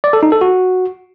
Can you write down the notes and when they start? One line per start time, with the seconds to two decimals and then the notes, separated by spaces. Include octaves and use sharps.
0.04 D5
0.13 A4
0.23 D#4
0.32 A4
0.41 F#4